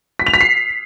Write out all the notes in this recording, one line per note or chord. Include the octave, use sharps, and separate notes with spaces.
B6
F7
B6
C7